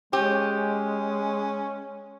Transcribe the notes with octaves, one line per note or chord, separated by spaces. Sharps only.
G#3 C#4 G4